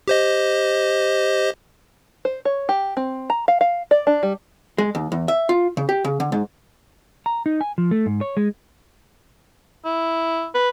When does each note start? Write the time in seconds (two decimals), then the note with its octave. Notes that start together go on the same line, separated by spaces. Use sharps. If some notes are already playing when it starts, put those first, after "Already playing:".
0.08 G4 C5 D#5
2.25 C5
2.45 C#5
2.69 G4
2.97 C4
3.30 A#5
3.48 F5
3.61 F5
3.91 D5
4.07 D4
4.23 G3
4.78 G#3
4.95 D#2
5.12 E2
5.28 E5
5.49 F4
5.77 C#3
5.89 G4
6.05 C#3
6.20 D3
6.32 G#2
7.26 A#5
7.46 D#4
7.61 G#5
7.78 F3
7.91 A3
8.06 G#2
8.21 C#5
8.37 G#3
9.85 E4
10.54 B4